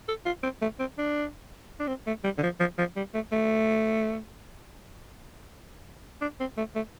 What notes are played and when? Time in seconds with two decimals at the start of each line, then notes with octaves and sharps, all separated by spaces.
0.08 A4
0.26 F4
0.43 C4
0.62 A3
0.79 C4
0.98 D4
1.80 D4
1.88 C4
2.07 A3
2.24 G3
2.38 D3
2.43 F3
2.60 F3
2.78 F3
2.96 G3
3.14 A3
3.32 A3
6.21 D4
6.40 C4
6.57 A3
6.76 A3